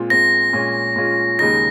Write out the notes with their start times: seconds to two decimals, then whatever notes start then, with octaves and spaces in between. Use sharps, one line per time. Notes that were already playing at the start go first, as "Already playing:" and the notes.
Already playing: A#2 G#3 C4 F4
0.10 A#2 G#3 C4 F4 A#6
0.53 A#2 G#3 C#4 F4
0.96 A#2 G#3 C#4 F4
1.39 D#2 C#3 G#3 D#4 A#6